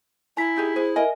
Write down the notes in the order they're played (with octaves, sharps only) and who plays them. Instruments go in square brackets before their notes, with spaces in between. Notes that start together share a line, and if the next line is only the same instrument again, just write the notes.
[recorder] E4 [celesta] G#5 B6 [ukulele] A#5
[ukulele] D#4 G4 G#4
[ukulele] G#4 [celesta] C5
[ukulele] A#4 D#5 [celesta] E5 G#5